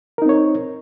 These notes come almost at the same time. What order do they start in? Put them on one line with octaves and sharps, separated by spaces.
A#4 D#4 C4 C#5